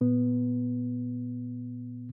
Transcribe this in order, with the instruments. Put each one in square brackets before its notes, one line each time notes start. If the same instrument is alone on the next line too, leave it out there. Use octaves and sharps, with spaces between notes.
[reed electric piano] A#2 B3